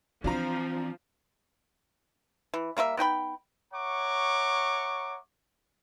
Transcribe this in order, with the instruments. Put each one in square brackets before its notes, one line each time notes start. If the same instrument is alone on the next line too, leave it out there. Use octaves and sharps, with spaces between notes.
[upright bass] E3 [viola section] F3 [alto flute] C4 [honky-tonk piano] D4 F4 A#5
[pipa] E3
G3 A#3 F4 E5
B3 D#4 G5 B5
[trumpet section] C#5 E5 F#5 A#5 C#6 D6